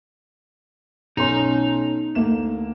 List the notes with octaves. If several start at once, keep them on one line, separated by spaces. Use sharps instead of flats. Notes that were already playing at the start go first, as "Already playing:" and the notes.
B1 C#4 D#4 A#5 C6
D2 A#3 E7